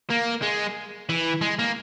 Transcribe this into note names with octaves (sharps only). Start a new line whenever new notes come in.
A#3
G#3
E3
G#3
A#3